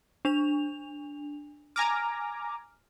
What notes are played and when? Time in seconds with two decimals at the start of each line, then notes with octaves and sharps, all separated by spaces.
0.25 D4 F7
1.76 G#5 A#5 D6 F6